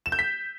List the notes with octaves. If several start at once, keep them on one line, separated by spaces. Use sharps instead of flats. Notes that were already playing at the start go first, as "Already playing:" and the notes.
E7
G6
B6